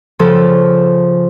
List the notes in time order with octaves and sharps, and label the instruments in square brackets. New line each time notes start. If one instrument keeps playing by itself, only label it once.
[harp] C#3 F3 A4